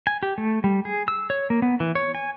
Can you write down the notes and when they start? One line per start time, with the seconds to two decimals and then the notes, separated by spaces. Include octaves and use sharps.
0.07 G#5
0.23 G4
0.38 A3
0.64 G3
0.85 G#4
1.08 E6
1.30 C#5
1.50 A#3
1.62 B3
1.80 E3
1.95 C#5
2.15 G#5